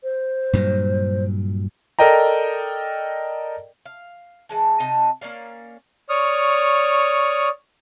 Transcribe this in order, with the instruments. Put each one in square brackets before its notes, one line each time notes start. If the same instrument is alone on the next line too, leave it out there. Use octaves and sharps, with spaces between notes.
[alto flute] C5
[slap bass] G2 A#2 F#3
[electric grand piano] A4 A#4 D5 D#5 G5 A#5
[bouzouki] F5
E3 G#3 A5
C3 D#4 D#5 A5
A#3 C#4 D5 F5
[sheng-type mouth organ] C#5 D5 C#6 D#6 F6